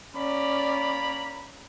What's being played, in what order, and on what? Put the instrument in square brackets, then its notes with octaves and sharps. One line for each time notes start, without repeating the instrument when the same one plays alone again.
[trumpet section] A#3 A#5 B5 [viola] C#4 D5